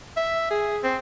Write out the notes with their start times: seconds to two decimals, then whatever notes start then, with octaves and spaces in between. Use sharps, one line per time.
0.17 E5
0.50 G#4
0.83 C4